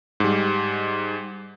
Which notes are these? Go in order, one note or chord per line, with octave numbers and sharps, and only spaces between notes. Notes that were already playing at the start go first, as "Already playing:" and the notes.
G#2 G3